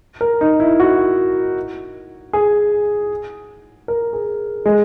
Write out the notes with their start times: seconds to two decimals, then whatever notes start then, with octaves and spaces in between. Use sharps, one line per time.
0.21 A#4
0.41 D#4
0.60 E4
0.80 F#4
2.33 G#4
3.88 A#4
4.13 G#4
4.66 G#3